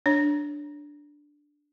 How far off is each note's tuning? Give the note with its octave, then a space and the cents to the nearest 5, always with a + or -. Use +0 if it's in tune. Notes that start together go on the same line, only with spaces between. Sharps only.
D4 +0 C#5 +0